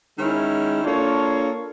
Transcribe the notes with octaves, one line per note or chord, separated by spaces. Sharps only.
D#3 G#3 C#4 E4
A#3 D4 F4 A4 C#5